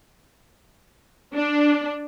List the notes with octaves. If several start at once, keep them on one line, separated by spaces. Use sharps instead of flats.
D4